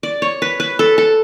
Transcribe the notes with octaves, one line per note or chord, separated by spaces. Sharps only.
D5
C#5
B4
B4
A4
A4